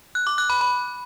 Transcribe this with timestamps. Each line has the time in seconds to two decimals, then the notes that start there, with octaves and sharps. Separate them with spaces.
0.15 F#6
0.27 D6
0.38 F#6
0.50 B5
0.61 B5